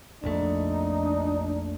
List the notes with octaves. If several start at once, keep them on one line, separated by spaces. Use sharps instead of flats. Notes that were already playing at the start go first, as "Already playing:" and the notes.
A#1 F2 A3 D4 D#4